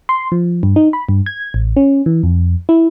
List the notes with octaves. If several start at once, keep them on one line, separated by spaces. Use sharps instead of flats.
C6
F3
G2
D#4
B5
G2
G#6
A1
C#4
E3
F2
E4